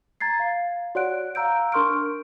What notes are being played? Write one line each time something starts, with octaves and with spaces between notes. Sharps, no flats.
A#5 G#6 A6 C7
F5
F#4 C#5 D5 F#5 F#6 D7
F5 A#5 E6 G6 D7
D4 A#4 C6 C#6 F6 D7